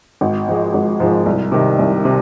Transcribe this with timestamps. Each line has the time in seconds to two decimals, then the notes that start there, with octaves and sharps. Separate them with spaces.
0.21 G#1
0.48 G#2 F3 G#3
0.74 G#1
1.00 G#2 F3 G#3
1.26 C2
1.52 C3 D#3
1.79 C2
2.05 C3